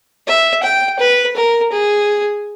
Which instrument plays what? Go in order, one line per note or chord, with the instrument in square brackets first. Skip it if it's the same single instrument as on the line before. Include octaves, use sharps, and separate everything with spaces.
[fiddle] E5
G5
B4
A#4
G#4